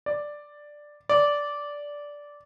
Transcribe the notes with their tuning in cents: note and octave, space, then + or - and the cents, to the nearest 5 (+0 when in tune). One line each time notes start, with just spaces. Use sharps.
D5 +5
D5 -10